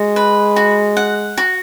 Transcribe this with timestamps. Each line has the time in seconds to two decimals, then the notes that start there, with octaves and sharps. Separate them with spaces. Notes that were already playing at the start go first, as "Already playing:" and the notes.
Already playing: G#3 F#4
0.16 B4
0.56 F#4
0.97 F#5
1.37 F#4